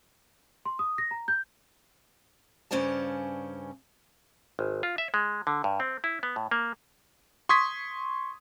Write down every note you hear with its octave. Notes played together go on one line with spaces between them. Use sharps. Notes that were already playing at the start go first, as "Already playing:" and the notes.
C6
D#6
A#6
A#5
G6
G2 C#3 C#4 C5 D5 A5
G#1
F4
E5
G#3
D3
G2
C4
E4
B3
A2
A#3
C6 C#6 D#6 G#6 B6